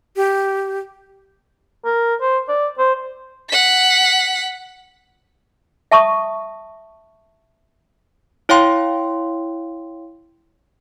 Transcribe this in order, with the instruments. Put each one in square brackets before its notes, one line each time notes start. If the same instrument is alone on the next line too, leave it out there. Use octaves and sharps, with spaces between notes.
[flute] G4
[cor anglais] A#4
C5
D5
C5
[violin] F#5 B6
[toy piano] E5 A5 C#6 D#6
[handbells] E4 C#5 F5 G5 C6